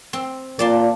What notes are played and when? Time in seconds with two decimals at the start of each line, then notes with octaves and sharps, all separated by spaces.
0.13 C4
0.59 A#2 D5 A5 C6